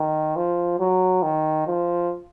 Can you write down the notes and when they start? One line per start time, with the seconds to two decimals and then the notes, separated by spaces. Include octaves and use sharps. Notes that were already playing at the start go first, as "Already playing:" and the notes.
Already playing: D#3
0.36 F3
0.80 F#3
1.23 D#3
1.67 F3